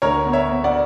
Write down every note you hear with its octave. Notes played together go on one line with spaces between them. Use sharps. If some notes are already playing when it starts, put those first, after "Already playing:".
D2 A#4 C#5
B3
C#5 E5
B3
D5 F#5